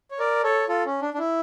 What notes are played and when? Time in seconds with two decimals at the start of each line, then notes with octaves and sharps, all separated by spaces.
0.11 C#5
0.19 A#4 D5
0.44 A4 C#5
0.68 F4 A4
0.85 C#4
1.02 D4
1.14 D4
1.18 E4